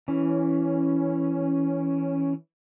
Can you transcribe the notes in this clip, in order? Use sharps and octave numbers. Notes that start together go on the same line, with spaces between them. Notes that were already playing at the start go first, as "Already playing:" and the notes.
E3 C#4